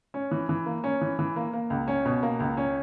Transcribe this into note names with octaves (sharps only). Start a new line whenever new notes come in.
C#4
E3
E3
A#3
C#4
E3
E3
A#3
A#3
C#2
C#4
B2
A#3
C#2
C#4